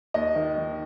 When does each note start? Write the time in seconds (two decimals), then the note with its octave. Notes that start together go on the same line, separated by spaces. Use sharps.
0.14 D#2 D#5
0.36 D#3
0.58 D#3